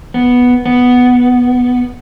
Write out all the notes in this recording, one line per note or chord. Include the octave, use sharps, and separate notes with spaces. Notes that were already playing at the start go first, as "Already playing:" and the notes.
B3
B3